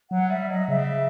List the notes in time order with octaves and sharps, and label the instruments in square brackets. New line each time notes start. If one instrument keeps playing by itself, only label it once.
[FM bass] F#3 [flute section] F#5
[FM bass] G3 [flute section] E5
[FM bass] F#3 [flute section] D#5
[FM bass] C#3 [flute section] E5